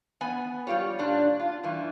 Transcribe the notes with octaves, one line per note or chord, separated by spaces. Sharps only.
B3 G#5
G3 G#3 F4 G4 C#5
A#2 D4
F4
G2 E3